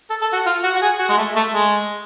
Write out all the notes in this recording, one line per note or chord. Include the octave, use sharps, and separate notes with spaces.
A4
A4
F#4
F4
F#4
F#4
G#4
F#4
G#3
A3
A3
G#3